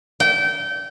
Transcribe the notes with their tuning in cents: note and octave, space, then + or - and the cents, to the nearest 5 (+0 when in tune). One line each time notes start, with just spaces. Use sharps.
G5 -25